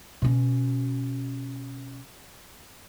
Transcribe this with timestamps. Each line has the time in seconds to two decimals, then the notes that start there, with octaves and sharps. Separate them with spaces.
0.22 B2 C#4